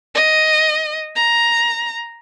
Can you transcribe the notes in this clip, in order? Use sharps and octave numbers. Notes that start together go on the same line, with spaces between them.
D#5
A#5